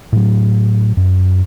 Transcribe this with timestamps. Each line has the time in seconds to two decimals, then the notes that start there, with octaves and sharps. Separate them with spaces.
0.12 A2 F#3
0.97 F#2